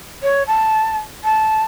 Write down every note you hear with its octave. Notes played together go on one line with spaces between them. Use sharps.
C#5
A5
A5